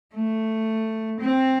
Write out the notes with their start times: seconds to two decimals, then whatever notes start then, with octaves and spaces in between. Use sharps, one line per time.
0.15 A3
1.20 C4